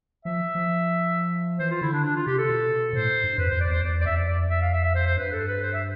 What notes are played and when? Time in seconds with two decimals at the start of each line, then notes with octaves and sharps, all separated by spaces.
0.25 F3 E5
0.55 F3
1.59 E3 C5
1.71 F4
1.81 D3 E4
1.93 D4
2.04 D4
2.15 F4
2.26 C3 G4
2.38 A4
2.49 B2
2.93 A2 C5
3.23 G2
3.38 F2 B4
3.49 F2 C5
3.60 D5
3.68 E2 C5
3.83 E2 D5
4.01 D5
4.05 F2 E5
4.16 D5
4.27 D5
4.50 E5
4.61 F5
4.72 E5
4.83 E5
4.95 C5
5.06 C5
5.17 G2 B4
5.32 A4
5.47 B4
5.62 C5
5.73 E5